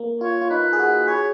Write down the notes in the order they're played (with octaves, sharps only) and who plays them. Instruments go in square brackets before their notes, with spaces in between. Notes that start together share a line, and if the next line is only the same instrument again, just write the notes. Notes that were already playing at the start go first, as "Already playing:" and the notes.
Already playing: [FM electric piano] A#3
[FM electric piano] F4 [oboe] C#5
[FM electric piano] F4
[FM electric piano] D#4 [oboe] B4
[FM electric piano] G#4
F#4
[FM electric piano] G#4 [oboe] C#5